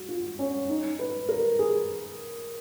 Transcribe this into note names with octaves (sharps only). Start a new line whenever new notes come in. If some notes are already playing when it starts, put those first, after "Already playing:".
Already playing: F#4
F4
C#4
D#4
B4
A#4
G#4